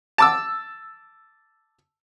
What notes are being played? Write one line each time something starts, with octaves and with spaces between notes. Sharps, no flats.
A5 D6 E6